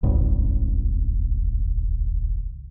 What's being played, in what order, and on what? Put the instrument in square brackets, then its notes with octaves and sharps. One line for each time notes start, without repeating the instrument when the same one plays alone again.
[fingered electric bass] D#1 G#1 C#2